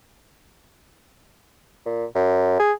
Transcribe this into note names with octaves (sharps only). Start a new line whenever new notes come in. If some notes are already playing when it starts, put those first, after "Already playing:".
A#2
F#2
G#4